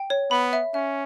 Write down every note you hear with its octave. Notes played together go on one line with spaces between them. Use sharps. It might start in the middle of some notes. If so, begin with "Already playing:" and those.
Already playing: G5
C#5
B3 B5
E5
C#4 E5